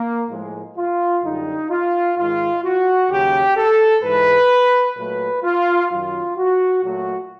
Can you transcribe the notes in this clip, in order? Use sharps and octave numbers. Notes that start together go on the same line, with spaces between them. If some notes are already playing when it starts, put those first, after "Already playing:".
Already playing: A#3
A2 F3 G#3
F4
F#2 D3 G3 D#4
F4
G#2 D#3 G#3 F4
F#4
D#2 C#3 F#3 G4
A4
G#2 E3 G#3 B4
A#2 F#3 A3 B4
F4
F#2 D#3 F#3 F4
F#4
A#2 F#3 A3 F#4